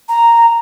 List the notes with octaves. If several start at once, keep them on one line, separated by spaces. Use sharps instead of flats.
A#5